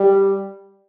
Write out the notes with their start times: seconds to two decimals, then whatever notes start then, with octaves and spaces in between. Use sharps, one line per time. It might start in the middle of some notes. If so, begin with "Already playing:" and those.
Already playing: G3